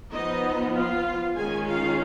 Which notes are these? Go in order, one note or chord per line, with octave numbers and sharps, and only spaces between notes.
F3 B3 D#4 D#5
F4 F5
D#3 G#3 C#4 G#4 G#5
F4 F5